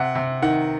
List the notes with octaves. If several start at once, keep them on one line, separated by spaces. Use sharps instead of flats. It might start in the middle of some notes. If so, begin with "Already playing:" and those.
Already playing: C3 F#5
C3
D#3 F#5